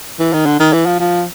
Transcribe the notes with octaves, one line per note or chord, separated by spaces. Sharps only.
E3
D#3
D3
D#3
E3
F3
F3